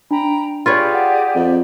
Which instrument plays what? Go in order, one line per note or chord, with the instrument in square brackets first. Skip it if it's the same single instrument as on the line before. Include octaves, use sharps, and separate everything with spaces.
[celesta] D4 [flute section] G5 A#5 B5
[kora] F4 B4 C#5 [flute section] G4 G#4 D5
[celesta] F#5
[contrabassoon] F2